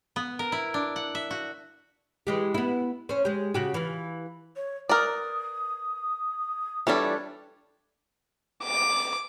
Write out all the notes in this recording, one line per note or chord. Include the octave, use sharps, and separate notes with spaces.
B3
A#4
E4
D4
F#5
E5
F#4
E3 G#3 G4
B3 E4
C#4 C5
G#3 G4
C#3 F#4 G4
E3 F4
C#5
A#4 B4 D5 D#6
E3 G3 D4 F4 A4 C#5
D6